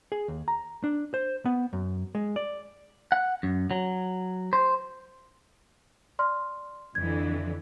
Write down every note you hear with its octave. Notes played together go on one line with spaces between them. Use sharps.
G#4
D#2
A#5
D4
C5
B3
F#2
G#3
D5
F#5
F#2
F#3
C5
D5 C6 F6
F2 D3 E3 G#6